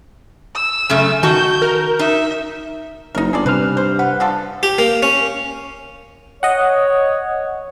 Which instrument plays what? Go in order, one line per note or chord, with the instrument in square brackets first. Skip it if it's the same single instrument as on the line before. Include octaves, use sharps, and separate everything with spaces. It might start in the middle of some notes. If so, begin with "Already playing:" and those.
[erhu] E6
[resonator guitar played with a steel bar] F#2 C#3 A3
[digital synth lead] D#3 [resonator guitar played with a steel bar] F#4 A5 [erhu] G6
[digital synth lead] A#4
[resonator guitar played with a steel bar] D#4 [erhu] E5
[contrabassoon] F#1 [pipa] D#4 A#4
[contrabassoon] G1 [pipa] G#3 A4 D5
[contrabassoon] G2 [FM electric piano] C3 F6 [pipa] B4 C5
[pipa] C5
[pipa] B4 [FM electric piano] F#5
[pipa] D3 F3 A4
[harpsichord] G4
A#3
C#4
[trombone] C#5 [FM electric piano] D#5 F#5